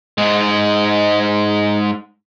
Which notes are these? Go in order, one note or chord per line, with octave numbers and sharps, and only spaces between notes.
G#2 G#3